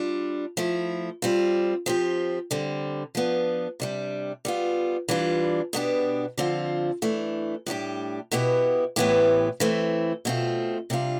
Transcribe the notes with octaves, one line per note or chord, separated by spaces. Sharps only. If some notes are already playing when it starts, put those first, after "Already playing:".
Already playing: G3 D4 F4
F3 A3 E4
G3 C4 F4
F3 C4 G4
D3 G3 C4
F3 B3 D4
C3 G3 D4
G3 B3 F4
E3 G3 D4 F4
B2 B3 D4 G4
D3 F3 C4 F4
E3 A3 D4
A2 G3 B3 D4 G4
B2 B3 E4 G4
A2 E3 B3 E4 G4
E3 A3 C4
B2 A3 C4 F4
C3 G3 D4 F4